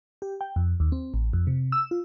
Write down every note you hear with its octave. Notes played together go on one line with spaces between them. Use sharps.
G4
G5
F2
D#2
C4
A1
F2
C3
E6
F4